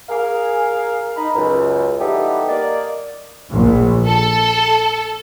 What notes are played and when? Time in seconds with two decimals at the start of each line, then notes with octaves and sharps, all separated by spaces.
0.09 G#4 A#4 F5
1.16 D#4 A#5 B5
1.35 C#2 F#2
1.99 E3 G3 B3 D#4 G4 A4
2.48 A#3 D5 D#5
3.52 A#1
4.06 A4